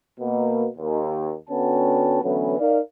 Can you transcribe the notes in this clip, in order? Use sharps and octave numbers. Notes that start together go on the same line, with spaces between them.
B2 A#3
D#2
D3 B3 C#4 F#4 G5 A5
D3 E3 F#3 A3 B3 C#4
D#4 A#4 D5 F5